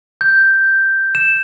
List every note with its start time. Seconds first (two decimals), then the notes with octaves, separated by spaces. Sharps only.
0.21 G6
1.15 E7